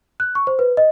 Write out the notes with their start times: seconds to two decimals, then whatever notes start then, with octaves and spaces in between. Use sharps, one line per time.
0.20 F#6
0.35 C#6
0.47 C5
0.59 B4
0.77 D#5